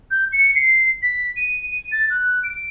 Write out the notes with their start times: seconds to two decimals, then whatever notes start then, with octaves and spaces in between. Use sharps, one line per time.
0.11 G6
0.33 C#7
0.56 C7
1.03 B6
1.37 D#7
1.72 D#7
1.92 A6
2.10 F#6
2.44 D7